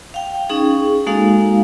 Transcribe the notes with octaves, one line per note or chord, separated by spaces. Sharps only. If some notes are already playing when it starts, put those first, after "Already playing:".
F5 G5
C#4 D#4 G#4
G#3 A#3 D#4 F#4 A4 F5